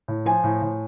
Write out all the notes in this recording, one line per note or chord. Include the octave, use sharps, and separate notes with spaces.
A2
F3 G#5
A2
A2